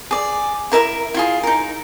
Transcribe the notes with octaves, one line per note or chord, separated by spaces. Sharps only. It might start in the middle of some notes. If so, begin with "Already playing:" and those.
G#4 D5
E4 A#4 E5 A#5
E4 F4 G#4
D#4 A#4